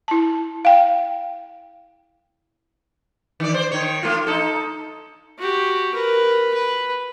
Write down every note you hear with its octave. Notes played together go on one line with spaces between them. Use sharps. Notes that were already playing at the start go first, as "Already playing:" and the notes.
E4 A5
F5 G5
D#3 D5
C5 D5
D#3 C#5
A3 F4
D#4 A4
F#4 G4
A#4 B4
B4